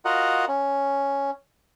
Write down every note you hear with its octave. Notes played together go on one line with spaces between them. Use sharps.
F4 F#4 A#4 D#5 F#5
C#4